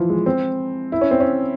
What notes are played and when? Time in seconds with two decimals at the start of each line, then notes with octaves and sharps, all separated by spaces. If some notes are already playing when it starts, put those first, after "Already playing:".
Already playing: E3 F3
0.09 G#3
0.26 C4
0.92 E4
1.01 C#4
1.11 C4
1.20 C#4